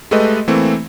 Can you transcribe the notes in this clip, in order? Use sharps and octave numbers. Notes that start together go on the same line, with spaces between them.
G#3 A3 G4 A4 B4 D#5
E3 A3 A#3 C4